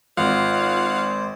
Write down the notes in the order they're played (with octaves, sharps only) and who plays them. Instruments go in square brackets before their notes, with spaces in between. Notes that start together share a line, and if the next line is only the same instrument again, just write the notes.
[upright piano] G#1 [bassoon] F4 [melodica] C5 [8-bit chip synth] F5 F#5